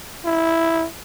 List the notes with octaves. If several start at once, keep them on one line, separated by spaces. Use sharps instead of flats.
E4